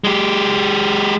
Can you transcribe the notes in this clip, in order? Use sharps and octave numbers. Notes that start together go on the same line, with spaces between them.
G#3 G4